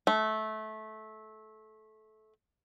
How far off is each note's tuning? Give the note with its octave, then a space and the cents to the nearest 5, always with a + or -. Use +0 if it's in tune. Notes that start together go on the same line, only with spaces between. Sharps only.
A3 -20